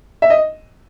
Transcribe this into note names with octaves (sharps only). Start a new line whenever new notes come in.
E5
D#5